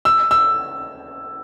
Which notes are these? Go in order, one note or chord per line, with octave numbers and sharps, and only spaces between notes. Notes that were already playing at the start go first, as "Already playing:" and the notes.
E6
E6